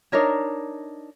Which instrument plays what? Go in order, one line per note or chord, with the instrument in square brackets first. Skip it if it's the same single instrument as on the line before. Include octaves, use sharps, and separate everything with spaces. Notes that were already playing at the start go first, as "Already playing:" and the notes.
[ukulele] D4 D#4 A#4 C#5